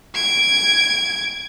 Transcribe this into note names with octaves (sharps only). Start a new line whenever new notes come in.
G#6 D7